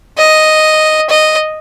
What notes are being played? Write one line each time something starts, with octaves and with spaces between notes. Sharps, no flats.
D#5
D#5